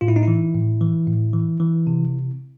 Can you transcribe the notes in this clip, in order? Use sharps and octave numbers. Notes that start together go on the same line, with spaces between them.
A2 F4
E4
D#4
E3 E4
A2
E3
A2
E3
E3
C3